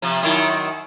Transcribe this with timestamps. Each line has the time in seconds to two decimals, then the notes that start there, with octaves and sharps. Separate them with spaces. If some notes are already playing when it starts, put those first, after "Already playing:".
0.02 C3 F3
0.23 F#2 D#3 E4